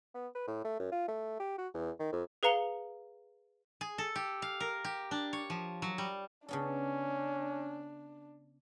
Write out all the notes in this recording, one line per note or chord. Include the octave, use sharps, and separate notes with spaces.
B3
B4
A2
A3
F#2
F4
A3
G4
F#4
E2
D#3
F2
G#4 B4 F5 A#5 C#7 G7
G#4
A4
G4
F5
A#4
G4
D4
C#5
F3
F#3
G3
C#3 B3 C#4 D4 A4